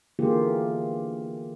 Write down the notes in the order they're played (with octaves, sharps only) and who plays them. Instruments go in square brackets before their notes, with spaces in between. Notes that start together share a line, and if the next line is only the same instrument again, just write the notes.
[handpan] D3 E3 A#3 F4 G4 G#4